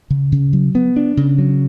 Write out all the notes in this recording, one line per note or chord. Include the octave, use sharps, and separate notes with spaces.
C#3
C#3
F#3
B3
D4
C#3
F#3